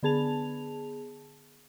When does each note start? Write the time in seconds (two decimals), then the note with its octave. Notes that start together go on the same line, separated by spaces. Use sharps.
0.03 D3 B3 G#4 A5 F7